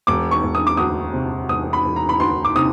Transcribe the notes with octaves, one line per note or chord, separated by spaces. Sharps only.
E1 D6
C#6
E1
D#6
D6
D2 D#6
C3
E1 D#6
B5
E1
A#5
B5
D2 C6
D6
C3 D#6